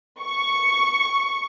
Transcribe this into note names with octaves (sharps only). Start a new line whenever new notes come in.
C#6